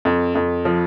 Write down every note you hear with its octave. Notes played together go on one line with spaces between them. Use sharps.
F2
F2
F3